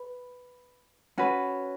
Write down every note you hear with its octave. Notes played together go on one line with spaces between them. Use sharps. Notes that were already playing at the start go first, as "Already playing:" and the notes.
Already playing: B4
C#4 F#4 B4